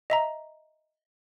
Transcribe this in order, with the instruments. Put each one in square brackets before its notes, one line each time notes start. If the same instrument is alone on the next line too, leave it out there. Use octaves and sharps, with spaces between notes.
[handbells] D#5 E5 A#5